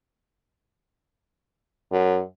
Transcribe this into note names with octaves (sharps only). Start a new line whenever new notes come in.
F#2